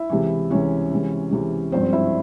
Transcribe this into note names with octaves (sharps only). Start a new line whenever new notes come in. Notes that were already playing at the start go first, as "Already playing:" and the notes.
Already playing: E4 E5
C#2 C3 E3
C#2 C3 E3 C#4 C#5
C#2 C3 E3
C#2 C3 E3
G#1 G2 F3 C4 C5
E4 E5